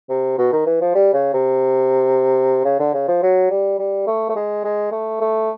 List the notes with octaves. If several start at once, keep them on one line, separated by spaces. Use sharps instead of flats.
C3
B2
D#3
E3
F3
G3
C#3
C3
C#3
D3
C#3
F3
F#3
G3
G3
A3
A3
G#3
G#3
A3
A3